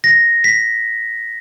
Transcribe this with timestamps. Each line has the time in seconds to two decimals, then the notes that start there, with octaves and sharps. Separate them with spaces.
0.04 A#6
0.44 B6